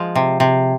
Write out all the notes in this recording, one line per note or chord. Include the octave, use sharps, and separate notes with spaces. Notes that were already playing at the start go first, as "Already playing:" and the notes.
Already playing: F3 G#3
C3
C3